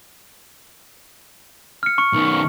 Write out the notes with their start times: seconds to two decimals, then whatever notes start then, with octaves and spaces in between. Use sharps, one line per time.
1.83 F6 C#7
1.98 C#6 C#7
2.13 B1 D#3